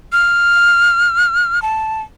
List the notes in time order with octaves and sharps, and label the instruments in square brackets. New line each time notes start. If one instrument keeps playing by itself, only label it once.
[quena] F6
A5